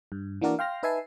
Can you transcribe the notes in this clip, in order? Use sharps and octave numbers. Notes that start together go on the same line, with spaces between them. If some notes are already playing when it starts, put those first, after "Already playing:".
G2
E3 A#3 D4 F#4 A#4 D5
F5 G5 C6 F6 A#6
D#4 B4 E5 G#5 A5 C7